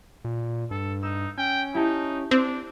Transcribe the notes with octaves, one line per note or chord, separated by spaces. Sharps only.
A#2
G2 A4
D#4 E6
C#4 G5
D#4 E4 G4 A5
C4 D4